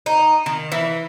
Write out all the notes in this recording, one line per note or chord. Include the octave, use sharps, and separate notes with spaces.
D#4
D#3
E3